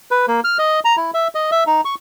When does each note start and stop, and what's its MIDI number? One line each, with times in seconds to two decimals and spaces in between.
0.11 0.26 71
0.28 0.40 58
0.44 0.58 89
0.59 0.80 75
0.85 0.96 82
0.97 1.11 64
1.14 1.28 76
1.35 1.51 75
1.51 1.64 76
1.67 1.81 63
1.85 1.95 85